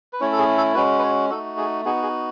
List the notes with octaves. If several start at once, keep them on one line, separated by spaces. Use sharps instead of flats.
B4
A3 C#4 E4 C#5
A4
G#4
A4
G#3 C#4 F#4 B4
B4
C#5
A3 D#4 F#4 A4
G#4
B3 D#4 F#4 G#4
G#4